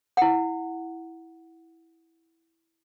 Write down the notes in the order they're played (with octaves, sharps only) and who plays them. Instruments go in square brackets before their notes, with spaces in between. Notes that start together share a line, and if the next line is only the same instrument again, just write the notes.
[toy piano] E4 F#5